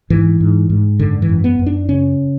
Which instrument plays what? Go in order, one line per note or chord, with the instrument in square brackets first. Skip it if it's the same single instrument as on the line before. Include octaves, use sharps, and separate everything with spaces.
[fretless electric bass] G#2 E3
G#2
G#2
F#2 D3
E3
F#2
B3
F#2
D4
C#3 C#4